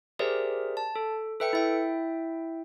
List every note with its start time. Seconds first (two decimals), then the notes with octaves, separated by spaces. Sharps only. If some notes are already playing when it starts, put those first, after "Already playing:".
0.19 G4 G#4 A#4 C5 D5 E5
0.77 A5
0.96 A4
1.40 A4 B4 E5 G5 C#7
1.53 E4 E5 G5